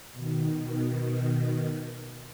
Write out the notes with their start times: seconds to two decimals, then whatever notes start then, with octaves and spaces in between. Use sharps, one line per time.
0.13 B2 D#3